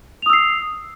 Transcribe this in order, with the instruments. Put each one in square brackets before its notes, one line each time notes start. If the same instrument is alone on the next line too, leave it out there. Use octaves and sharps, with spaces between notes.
[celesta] F7
D#6
E6
C7